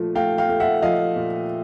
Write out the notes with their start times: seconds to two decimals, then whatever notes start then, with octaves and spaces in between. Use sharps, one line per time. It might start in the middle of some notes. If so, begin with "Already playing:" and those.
Already playing: A#2 F3 A3
0.15 A3 F5 G5
0.38 F5 G5
0.49 A3
0.60 E5 F#5
0.82 F3 D#5 F5
1.16 A#2